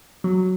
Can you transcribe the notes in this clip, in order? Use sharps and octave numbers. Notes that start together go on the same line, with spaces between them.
F#3